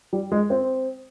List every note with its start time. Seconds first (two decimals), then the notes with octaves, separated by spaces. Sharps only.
0.13 G3
0.32 G#3
0.50 C4